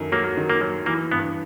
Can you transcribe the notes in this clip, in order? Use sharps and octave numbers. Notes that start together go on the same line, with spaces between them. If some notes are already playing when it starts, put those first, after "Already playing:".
Already playing: F#2 D#3 A3
F#3 A#3
D#3
A#3
F#3
E3 A#3
G2 B3